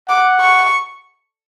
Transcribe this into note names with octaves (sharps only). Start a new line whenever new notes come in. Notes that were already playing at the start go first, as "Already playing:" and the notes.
F#5 D6
C#6